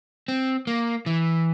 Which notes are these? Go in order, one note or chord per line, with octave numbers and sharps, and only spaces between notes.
C4
A#3
E3